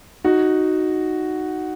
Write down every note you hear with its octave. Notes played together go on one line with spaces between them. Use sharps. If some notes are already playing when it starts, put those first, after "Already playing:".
D#4 F#4